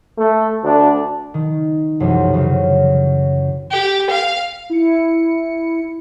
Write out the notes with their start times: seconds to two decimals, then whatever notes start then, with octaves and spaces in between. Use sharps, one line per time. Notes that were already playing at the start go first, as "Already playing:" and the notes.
0.18 A3
0.63 D2 D4
1.34 D#3
2.00 F1 C2 F#2 E3
2.34 F#2 C#3
3.71 G4
4.11 F5
4.70 E4 C#7